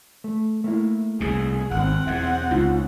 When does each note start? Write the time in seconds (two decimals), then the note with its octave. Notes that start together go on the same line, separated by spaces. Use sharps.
0.24 A3
0.64 A3 A#3 E4
1.20 C2 B2 G#4
1.71 G#1 C4 F#5
2.07 B1 E2 E5
2.51 C#2 D#4 F4